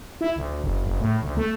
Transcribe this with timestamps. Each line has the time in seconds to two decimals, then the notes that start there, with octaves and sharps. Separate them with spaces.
0.21 E4
0.36 D2
0.63 F#1
0.85 F#1
1.00 A2
1.22 D2
1.37 A3